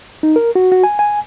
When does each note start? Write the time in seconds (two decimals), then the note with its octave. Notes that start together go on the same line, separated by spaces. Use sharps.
0.23 D#4
0.36 A#4
0.55 F#4
0.72 F#4
0.83 G#5
0.99 G#5